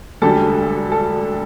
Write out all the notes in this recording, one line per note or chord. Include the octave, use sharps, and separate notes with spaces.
E1 D2 D3 G3 A4
A4